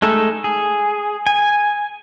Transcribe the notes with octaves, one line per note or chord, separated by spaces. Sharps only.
G#3 A3 D#4 A4
G#4
G#5